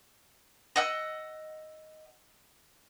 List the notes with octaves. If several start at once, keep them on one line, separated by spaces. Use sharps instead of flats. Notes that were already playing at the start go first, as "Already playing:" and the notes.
D#5 F#5 E6